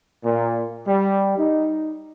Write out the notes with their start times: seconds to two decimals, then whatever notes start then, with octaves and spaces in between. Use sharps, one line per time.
0.24 A#2
0.85 G3
1.36 D#4